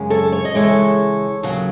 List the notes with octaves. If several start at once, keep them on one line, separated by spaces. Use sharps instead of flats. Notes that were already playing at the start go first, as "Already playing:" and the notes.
Already playing: F#2 C#3 G#3
A4 C#5
C#5
D#5
C#3 E3 G#3 A4 C#5
D#2 C#3 F#3